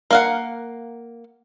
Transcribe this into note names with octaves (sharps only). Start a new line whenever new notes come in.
A#3 F5 F#5